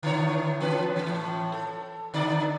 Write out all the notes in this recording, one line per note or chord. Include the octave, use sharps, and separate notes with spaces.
D3 E4 C#5
E3 C#4 B4
A2 E3
A4
D3 D#4 D5